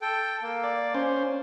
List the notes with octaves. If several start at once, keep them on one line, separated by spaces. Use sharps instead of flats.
A4 G5
A#3
D5
C#4 C5